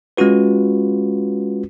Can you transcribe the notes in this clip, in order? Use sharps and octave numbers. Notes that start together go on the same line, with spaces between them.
G#3 C#4 F4 F#4 B4